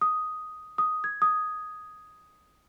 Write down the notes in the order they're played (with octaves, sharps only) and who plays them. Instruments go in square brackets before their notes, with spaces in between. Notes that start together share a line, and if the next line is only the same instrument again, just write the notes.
[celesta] D#6
D#6
G#6
D#6